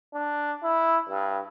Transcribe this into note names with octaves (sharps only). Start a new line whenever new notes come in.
D4
E4
G2